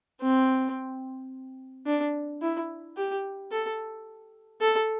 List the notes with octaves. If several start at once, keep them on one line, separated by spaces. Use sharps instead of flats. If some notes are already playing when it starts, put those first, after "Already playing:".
C4
D4
E4
G4
A4
A4